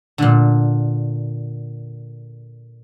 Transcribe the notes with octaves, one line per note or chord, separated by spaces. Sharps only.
A#2 D3